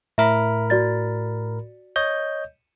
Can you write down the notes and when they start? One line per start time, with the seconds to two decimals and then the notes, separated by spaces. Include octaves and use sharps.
0.18 A2 A#4 E5 B5
0.70 F#4 D5 A6
1.96 C#5 D#5 G6